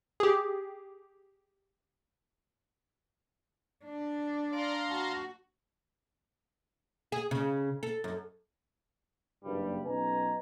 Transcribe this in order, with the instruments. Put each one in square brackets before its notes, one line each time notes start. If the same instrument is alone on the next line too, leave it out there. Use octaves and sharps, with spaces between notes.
[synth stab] G4 G#4
[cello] D4
[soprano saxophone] D5 [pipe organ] F5 A#5 C6
[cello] F#4 [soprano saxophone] A5
[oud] G#4
C#3
A4
F#2
[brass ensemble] F#1 G2 G3
B1 C#4 D#4 B4 G#5 A#5